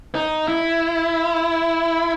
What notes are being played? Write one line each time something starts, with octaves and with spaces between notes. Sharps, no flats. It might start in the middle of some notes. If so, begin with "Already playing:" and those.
D#4
E4